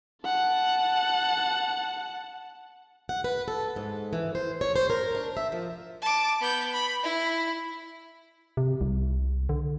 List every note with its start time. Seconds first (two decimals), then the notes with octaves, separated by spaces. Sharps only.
0.25 F#5 A5
3.09 F#5
3.24 B4
3.48 A4
3.76 G#2
4.13 E3
4.35 C5
4.61 C#5
4.76 C5
4.90 A#4
5.15 D4
5.37 E5
5.52 F3
6.02 A5 D6
6.41 B3 G6
6.73 B5
7.03 E4
8.57 C3
8.81 C2
9.49 D3